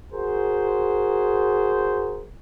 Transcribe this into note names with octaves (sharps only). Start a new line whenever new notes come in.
F#4 G#4 A#4 C5